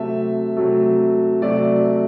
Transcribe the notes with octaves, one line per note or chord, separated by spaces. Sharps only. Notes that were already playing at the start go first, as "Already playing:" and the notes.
Already playing: C3 F#3 A3 E5
C3 F#3 A3
C3 F#3 A3 D5